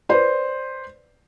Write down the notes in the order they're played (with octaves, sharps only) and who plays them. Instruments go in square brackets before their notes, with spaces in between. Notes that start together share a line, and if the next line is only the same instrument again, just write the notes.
[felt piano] B4 C5 D5